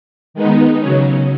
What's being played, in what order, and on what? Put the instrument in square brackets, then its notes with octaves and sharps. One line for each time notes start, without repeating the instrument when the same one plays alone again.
[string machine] D#3 G#3 B3 D#4
C#3 F#3 C#4